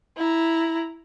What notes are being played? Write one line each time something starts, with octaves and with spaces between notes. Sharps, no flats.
E4 A#5